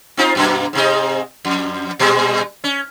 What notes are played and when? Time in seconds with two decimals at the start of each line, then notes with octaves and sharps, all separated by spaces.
0.17 C4 D#4 F4
0.35 F#2 B2 A#3
0.73 G#2 C3 D#5
1.45 F2
1.99 A#2 G3 G#3
2.64 C#4